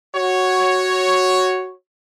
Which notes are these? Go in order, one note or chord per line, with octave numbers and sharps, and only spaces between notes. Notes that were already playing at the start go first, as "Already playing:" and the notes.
F#4 C#5